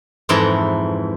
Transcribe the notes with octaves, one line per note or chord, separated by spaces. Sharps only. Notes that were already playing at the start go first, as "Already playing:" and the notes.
F2 G#2 E3 E4 A5 A#5